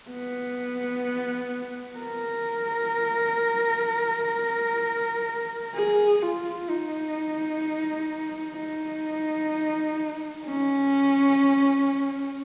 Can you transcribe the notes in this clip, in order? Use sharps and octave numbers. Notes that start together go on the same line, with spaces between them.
B3
A#4
G#4
F4
D#4
D#4
C#4